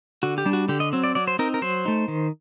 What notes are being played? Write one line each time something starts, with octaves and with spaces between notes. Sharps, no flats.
D3 F#4
G4
G3 D4
F#4
D3 G4
D#5
F#3 C4
D5
F#3 D5
C5
C4 D#4 A#4
A#4
F#3 C5
A3 D#4
D#3